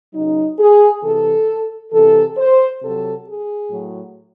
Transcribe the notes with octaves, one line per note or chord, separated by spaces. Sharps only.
C#3 F#3 D#4
G#4
C3 E3 A4
C3 E3 A4
C5
C3 F#3 A4
G#4
A2 F#3